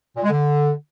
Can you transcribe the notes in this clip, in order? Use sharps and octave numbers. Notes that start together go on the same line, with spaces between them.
A#2
G#3
D3